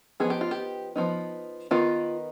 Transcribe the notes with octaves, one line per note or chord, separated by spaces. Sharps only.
F3 B3 D#4 G#4
G4
F4
G4
F3 B3 D#4
D#3 B3 D#4 F4